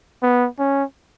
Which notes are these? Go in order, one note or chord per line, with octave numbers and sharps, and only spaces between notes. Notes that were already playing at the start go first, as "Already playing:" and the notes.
B3
C#4